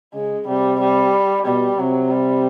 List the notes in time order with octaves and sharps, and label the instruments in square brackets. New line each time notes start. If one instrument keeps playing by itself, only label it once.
[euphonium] C#3 [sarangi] G#3
[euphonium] C3 [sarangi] G3
[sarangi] G3
[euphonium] B2 [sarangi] G3
[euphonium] C3 [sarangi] F#3
[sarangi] G3